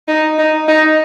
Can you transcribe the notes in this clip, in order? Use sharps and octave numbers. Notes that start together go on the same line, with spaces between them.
D#4
D#4
D#4